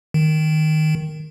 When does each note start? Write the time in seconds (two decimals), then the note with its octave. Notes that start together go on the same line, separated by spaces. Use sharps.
0.14 D#3